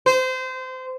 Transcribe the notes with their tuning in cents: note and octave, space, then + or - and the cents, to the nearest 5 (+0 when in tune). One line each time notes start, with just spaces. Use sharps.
C5 -25